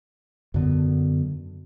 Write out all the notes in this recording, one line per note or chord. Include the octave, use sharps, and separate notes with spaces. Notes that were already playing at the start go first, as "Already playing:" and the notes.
F#2 D3 B3